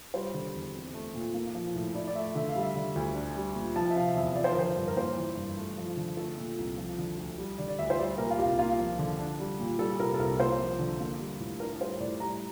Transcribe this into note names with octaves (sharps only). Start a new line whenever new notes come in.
G3 C5
D3
E2
C4
A3
A#2
A#3
F3
A2
E4 D5
D5
A3 E5
D3 E5
F5
G3
E5
D3
D2
D4
G3
A#2
F3 A5
E5
C3 F5
E2 E5
F3 D5
C5
A#4
D3 C5
G2
A#4
A#3 C5
E3
G2
A3
F3
D3
A3 A4
A#2
C2
F3
D3
D2
G3
D3 D5
D5
D2 E5
C5
G3 D5
A#2 A#4
F4
C2 G4
A#3 F4
F3
D3
D4
G3
A#2
G3 A4
C3 A#4
A4
C2 A#4
A#3 C5
F3
D3
A#3
G3
A2
D4 A#4
G3 C5
A2 D5
G3 A#5